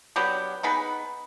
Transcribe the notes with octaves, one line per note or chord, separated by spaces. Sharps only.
F#3 B3 D4 G4
B3 D#4 G#4 B4